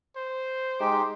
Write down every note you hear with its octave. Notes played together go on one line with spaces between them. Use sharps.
C5
G#3 D#4 G4 C6 D6